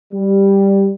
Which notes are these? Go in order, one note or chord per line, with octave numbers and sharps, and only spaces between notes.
G3